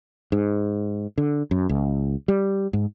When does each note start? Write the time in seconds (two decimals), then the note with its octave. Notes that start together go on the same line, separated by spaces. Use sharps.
0.32 G#2
1.18 D3
1.51 F#2
1.69 C#2
2.28 G3
2.73 G#2